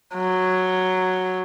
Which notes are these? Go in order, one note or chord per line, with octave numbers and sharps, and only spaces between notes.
F#3